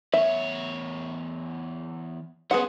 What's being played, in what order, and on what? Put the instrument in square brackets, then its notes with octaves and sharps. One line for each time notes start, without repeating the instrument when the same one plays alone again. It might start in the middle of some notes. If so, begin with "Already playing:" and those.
[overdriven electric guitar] E2 C#5 [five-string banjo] E5
[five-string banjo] B3 G#4 F#5 [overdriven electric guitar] C#4 C5